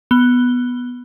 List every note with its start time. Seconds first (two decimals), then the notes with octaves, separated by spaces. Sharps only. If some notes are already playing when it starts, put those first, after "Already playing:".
0.11 B3 G7